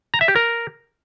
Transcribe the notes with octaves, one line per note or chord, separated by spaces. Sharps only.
A#5
E5
G4
A#4